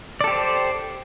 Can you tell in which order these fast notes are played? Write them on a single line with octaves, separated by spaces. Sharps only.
D5 A4 G4 C5